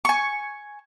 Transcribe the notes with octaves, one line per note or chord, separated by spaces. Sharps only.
G#5 C#6